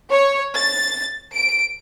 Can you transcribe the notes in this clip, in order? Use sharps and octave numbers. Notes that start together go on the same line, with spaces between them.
C#5
A6
D7